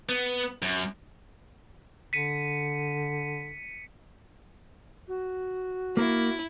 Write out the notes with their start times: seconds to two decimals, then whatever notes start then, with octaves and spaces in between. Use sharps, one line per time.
0.09 B3
0.62 F#2
2.13 D3 B6 C#7 D#7
5.08 F#4
5.97 A#3 E4 A#4